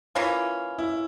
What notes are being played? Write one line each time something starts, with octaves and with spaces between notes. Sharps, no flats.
E3 A#3 C#4 F4
E4